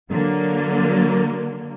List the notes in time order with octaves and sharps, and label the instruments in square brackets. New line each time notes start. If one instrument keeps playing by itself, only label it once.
[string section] D3 F#3 A#3